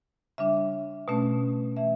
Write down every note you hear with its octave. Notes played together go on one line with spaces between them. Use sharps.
C#3 G3 D4 E5
B2 A3 C#4
E3 A3 E5